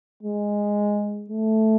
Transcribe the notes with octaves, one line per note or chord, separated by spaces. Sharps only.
G#3
A3